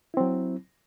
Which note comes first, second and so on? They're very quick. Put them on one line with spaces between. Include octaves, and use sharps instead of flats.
E4 C4 F#3